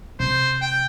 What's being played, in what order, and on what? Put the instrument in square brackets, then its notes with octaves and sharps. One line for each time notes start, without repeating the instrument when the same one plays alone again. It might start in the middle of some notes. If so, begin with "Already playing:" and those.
[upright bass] C3 [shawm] C5
[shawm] G5